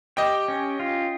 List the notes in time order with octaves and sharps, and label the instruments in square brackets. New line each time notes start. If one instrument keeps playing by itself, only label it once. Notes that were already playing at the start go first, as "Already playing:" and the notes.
[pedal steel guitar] G4 [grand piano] D#5 G5
[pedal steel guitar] C#4
F4